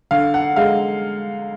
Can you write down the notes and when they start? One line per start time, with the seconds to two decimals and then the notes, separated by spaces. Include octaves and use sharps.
0.11 D3 F5
0.34 F#5
0.56 G#3 F5